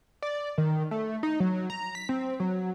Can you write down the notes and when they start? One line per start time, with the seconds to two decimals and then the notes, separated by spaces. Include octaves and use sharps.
0.22 D5
0.58 D#3
0.91 A3
1.23 D#4
1.40 F#3
1.70 A#5
1.95 B6
2.09 C4
2.40 F#3